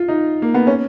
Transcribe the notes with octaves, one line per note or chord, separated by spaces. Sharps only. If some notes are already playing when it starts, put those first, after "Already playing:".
Already playing: F4
D#4
A#3
B3
C#4